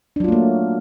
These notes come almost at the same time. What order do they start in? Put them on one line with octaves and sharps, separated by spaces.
D4 F#3 F4 A3 A#3